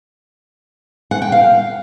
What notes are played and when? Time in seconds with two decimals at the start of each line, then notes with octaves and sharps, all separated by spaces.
1.11 F#5
1.22 G5
1.32 F5